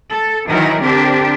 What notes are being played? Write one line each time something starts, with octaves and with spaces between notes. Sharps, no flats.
A4
D#3 E3 F#3 D#4 A#4
D3 C4 D4 G4 A#4